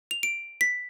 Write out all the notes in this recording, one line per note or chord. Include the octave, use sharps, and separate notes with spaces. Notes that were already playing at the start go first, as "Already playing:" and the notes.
F7
D7
B6